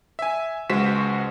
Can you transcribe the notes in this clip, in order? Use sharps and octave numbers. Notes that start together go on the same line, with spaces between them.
E5 G#5
C#2 G#3 F#4 C5 B6 E7